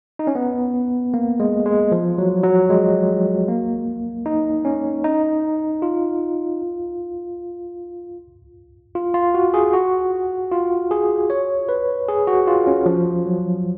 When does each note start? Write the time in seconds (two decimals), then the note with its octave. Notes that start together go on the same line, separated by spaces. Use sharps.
0.19 D#4
0.27 C#4
0.35 B3
1.14 A#3
1.40 G#3
1.66 G#3
1.92 F3
2.18 F#3
2.44 F#3
2.70 G#3
3.48 A#3
4.26 D#4
4.65 C#4
5.04 D#4
5.82 F4
8.95 F4
9.14 F4
9.34 F#4
9.54 G#4
9.73 F#4
10.51 F4
10.91 G#4
11.30 C#5
11.69 B4
12.08 G#4
12.27 F#4
12.47 F4
12.67 C#4
12.86 F3
13.26 F#3